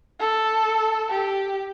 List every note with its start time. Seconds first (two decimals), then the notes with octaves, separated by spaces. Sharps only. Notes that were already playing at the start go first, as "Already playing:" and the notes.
0.20 A4
1.10 G4